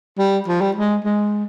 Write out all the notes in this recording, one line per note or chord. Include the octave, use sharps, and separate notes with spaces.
G3
F3
G3
G#3
G#3